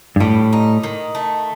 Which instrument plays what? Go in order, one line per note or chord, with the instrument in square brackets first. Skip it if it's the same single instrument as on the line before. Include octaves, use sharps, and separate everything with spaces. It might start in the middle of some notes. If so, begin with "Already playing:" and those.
[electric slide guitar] G2
[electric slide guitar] A2 [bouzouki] G3
[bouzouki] D#4
D#3
A3